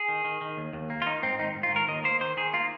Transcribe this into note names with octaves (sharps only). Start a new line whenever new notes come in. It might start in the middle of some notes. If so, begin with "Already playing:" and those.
Already playing: G#4
D#3
D#3
D#3
D#2
D#2
A#3
F4
D#3 D#4
G#2 C4
D#3 D#4
G#2
F4
D#3 A#4
D#2 D#5
A#3 C5
D#3 C5
D#3 G#4
A#3 F4